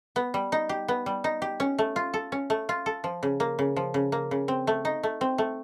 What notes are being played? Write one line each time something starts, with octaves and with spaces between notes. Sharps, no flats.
B3
G3
D#4
G4
B3
G3
D#4
G4
C#4
A3
F4
A4
C#4
A3
F4
A4
F3
C#3
A#3
C#3
F3
C#3
A#3
C#3
C4
A3
D#4
A3
C4
A3